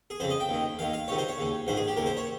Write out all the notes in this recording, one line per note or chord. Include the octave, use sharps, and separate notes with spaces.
G#4
F2 C#3 C5
D#5
G5
D#2 D#3
D#2 D#3 F5
F5
C#2 C3 D#3 C#5
C5
C#5
D#2 C#3
A#1 G#2 D#3 C5
G#4
G4
D#2 C#3 A#4
C5
C#5